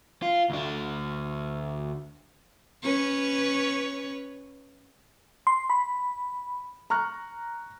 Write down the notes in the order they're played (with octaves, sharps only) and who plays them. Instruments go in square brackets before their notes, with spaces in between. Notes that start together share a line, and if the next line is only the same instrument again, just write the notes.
[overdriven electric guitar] F4
D2 D4
[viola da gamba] C#4 B4 C#5
[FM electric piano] C6
B5
[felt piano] A#5 C#6 F6 F#6